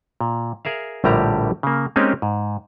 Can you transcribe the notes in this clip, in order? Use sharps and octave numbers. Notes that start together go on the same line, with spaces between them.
A#2
G#4 A#4 E5 F5
A#1 A2 D3 G3 G4 A#5
C#3 A#3
G#3 A#3 C4 C#4 D#4 G4
G#2